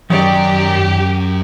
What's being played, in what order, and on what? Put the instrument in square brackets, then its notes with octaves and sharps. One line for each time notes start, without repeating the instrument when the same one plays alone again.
[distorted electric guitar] F#2 [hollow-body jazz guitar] D#3 C#5 D5 [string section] G4